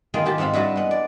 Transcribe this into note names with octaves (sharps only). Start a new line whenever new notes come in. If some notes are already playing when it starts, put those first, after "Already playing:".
D#3 A#3 B3 F4 G#4
D#3 G4 A5
G#2 F3 C4 F5 B5
G2 E4 F#4 B4 A5
G#3 B3
D5